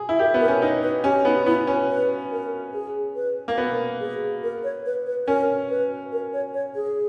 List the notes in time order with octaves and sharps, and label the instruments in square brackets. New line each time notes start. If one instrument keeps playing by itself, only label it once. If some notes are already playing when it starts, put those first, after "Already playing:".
Already playing: [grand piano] G#4
E4
[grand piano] G4 [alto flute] A#4
[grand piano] B3
[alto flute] A#4
[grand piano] C#4
[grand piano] D#4 [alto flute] B4
[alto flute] B4
[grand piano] C#4 [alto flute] G4
[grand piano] B3 [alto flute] D#4
[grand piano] B3 [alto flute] E4
[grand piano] C#4 [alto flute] B4
[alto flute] B4
A#4
G#4
B4
[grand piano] A#3
[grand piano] B3 [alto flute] A#4
[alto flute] G#4
A#4
C#5
B4
B4
[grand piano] C#4 [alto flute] A#4
[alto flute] B4
A#4
C#5
C#5
G#4